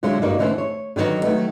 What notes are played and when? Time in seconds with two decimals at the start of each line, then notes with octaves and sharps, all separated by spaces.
0.03 A#2 D3 F#3 G#3 D4 E4
0.22 G2 A#3 D#4 F#4 D5
0.38 D3 E3 A3 C#4 A4 C5
0.58 C#5
0.96 D3 D#3 F#3 B3 D#4
1.23 D#3 F#3 A3 B3